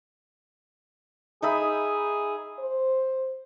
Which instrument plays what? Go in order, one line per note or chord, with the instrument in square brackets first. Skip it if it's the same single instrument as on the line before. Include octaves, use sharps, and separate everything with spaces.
[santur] D#4 E5 B5 [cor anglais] G#4
[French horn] C5